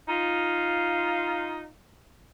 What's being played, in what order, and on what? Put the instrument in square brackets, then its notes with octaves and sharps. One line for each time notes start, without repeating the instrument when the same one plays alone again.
[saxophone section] D#4 F4